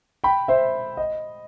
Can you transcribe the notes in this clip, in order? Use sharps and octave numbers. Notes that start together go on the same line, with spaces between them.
G5 B5
C5 E5
D#5